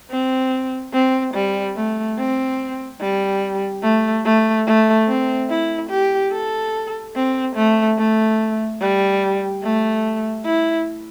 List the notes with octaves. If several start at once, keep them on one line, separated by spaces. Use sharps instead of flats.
C4
C4
G3
A3
C4
G3
A3
A3
A3
C4
E4
G4
A4
C4
A3
A3
G3
A3
E4